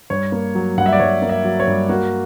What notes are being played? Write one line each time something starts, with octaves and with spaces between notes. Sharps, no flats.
G2 C#5
A#3
F#3
G2 F#5
E5
D5
G2 C#5
A#3
E5
F#3
C#5
G2
A#3 F#4